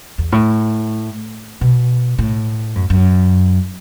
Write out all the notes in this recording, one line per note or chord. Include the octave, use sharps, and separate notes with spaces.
E2
A2
B2
A2
F#2
F#2